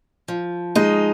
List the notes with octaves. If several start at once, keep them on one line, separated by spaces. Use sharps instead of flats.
F3
G#3 D#4